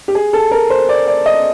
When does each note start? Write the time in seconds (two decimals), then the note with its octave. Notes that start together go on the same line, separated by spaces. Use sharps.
0.08 G4
0.15 G#4
0.33 A4
0.51 A#4
0.70 C5
0.89 D5
1.07 D5
1.26 D#5